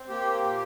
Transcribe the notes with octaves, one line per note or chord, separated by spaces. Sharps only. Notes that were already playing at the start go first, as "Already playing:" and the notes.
Already playing: C4
A#3 G4
A#2